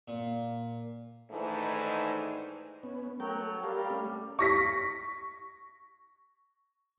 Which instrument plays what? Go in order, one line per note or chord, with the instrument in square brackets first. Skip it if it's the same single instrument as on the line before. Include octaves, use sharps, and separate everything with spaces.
[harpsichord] A#2
[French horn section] G#2 D#3 E3 A3 D4 D#4
[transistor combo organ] B3 C#4
[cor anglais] F#3 [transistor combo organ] A3 A#4 G5
[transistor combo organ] A4
[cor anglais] G3 [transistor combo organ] G4 A#4 F5
[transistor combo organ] A3 C#4
[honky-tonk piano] C#6 A#6 B6